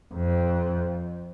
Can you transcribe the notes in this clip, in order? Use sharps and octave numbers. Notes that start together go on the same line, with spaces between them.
F2